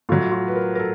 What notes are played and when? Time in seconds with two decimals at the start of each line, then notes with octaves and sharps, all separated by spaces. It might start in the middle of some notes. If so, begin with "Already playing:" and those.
0.09 A2 F#3 F4
0.32 F4
0.48 B4
0.56 A#4
0.75 A#4
0.79 A4